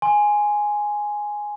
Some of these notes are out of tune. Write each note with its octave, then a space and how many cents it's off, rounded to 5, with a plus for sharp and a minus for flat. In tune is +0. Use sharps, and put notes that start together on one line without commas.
G#5 +0 C6 +0